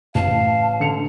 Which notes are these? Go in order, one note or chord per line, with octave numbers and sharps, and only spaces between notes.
A1 F5 A5
D3 C#7 F7